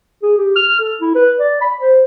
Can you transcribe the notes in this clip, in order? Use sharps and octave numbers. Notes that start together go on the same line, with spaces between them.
G#4
G4
F6
A4
E4
B4
D5
B5
C5